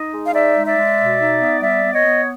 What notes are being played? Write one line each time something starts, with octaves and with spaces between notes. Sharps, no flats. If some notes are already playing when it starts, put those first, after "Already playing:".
Already playing: D#4 D#5
G#3
F5
D#4 D5 E5
G#3
D5 E5
G#3
B2
D#4
B3
G3 D5 E5
B3
C#5 D#5
B3